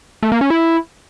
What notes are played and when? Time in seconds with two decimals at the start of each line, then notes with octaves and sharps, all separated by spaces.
0.23 A3
0.32 A#3
0.41 C#4
0.50 E4